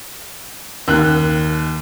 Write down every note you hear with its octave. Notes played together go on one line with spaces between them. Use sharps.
D#2 F#6